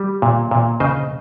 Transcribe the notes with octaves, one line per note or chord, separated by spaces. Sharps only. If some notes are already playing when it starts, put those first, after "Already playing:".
Already playing: G3
A#2
A#2
C#3 C5 D#5